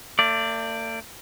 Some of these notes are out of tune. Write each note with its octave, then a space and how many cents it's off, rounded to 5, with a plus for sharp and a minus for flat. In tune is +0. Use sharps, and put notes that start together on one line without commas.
A3 +40 D5 +0